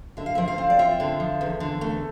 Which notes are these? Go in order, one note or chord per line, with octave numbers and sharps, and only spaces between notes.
D3 E5
F5
F3 E5
F5
C4
D5
F4 E5
D3
F3
E2
D3
A3